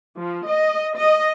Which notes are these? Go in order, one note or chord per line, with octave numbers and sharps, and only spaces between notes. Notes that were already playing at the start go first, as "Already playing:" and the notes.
F3
D#5
D#5